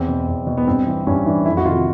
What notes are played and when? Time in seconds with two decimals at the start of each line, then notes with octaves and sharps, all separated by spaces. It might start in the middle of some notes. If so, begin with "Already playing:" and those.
Already playing: E2 C4
0.08 B2
0.27 E2
0.47 B2
0.57 B3
0.66 G2 C4
0.87 E3
1.07 G2 C#4
1.26 E3 D4
1.46 F2 E4
1.57 F#4
1.66 C3 D#3 F4